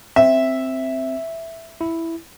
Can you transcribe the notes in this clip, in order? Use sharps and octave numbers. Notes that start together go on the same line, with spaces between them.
C4 E5
E4